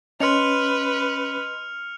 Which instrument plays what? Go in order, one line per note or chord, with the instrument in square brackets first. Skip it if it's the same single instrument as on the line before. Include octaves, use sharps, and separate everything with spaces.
[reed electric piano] C#4 [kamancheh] B4 [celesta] D#5 C6 [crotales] F6 C#7 F7